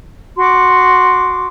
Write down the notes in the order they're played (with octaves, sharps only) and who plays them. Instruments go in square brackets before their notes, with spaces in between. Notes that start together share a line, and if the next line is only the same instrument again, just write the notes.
[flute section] F#4 C6 D6